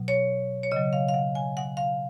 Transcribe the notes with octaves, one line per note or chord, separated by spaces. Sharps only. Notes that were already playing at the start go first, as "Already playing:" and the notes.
Already playing: B2 F#3
C#5
C#5
C#3 F#3 D#5
F5
F5
F#5
G#5
F#5
F5